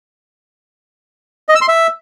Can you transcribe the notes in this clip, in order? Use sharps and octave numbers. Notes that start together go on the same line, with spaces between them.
D#5
E6
C6
E5